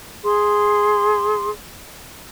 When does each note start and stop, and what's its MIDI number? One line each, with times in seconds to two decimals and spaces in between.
0.23 1.49 68
0.23 1.49 84